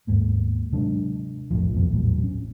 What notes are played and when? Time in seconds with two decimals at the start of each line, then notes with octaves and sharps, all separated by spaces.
0.07 D#2 G#2 A#3 B3
0.72 C3 F#3 G#3 D4
1.51 B1 F2 A2 F3
1.74 F2 A2 F3 B3
1.90 A#1 E2 A2 F#3
2.24 C#4